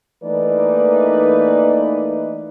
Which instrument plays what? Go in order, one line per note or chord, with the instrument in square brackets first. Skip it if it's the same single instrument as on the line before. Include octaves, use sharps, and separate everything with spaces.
[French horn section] E3 A3 A#3 D#4 B4 D5